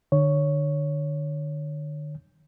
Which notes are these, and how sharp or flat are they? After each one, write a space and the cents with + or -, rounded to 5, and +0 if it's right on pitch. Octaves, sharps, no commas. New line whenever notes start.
D3 +40 C#5 +5